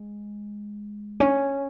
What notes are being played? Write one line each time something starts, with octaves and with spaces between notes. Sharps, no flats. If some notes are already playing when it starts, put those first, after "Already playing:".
Already playing: G#3
C#4